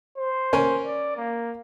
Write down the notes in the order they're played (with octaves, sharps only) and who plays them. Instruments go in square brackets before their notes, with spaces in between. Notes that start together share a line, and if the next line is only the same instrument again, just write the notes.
[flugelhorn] C5
[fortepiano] C#4 A#4 G#5
[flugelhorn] D5
A#3